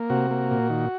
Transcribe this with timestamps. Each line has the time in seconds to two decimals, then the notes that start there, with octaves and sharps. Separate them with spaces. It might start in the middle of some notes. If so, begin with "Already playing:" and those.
Already playing: A#3
0.10 C3 F#4
0.31 A#3
0.51 A#2
0.70 D#3